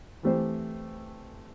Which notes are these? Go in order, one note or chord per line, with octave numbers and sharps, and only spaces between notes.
E3 A3 C4 G4 C5